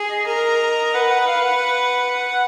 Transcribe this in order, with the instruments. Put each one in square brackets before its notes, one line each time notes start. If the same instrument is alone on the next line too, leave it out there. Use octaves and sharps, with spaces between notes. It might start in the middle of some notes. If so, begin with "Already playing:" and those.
Already playing: [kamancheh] G#4
[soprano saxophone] D#5
[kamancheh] A#4
[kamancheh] B4 [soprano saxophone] F#5
[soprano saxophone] F#5
F5
F#5